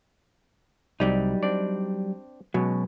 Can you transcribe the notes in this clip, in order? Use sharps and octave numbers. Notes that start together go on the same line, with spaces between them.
C2 F#3 G3 D#4 D5
C4 D4 D5
B2 F#3 G#3 C#4